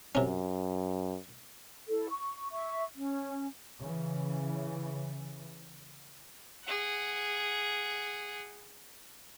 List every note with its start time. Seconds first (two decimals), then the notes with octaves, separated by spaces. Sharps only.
0.15 F#2 C3 C#4
1.88 E4 A4
2.11 C#6
2.53 E5 C#6
2.96 C#4
3.80 C#3 E3
6.65 G#4 F#5